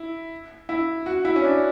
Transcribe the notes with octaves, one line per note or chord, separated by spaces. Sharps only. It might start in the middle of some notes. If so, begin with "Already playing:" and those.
Already playing: E4
E4
F#4
E4
C#4
D4